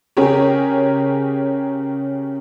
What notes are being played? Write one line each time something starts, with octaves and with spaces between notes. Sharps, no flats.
C#3 G4 G#4 A#4 C#5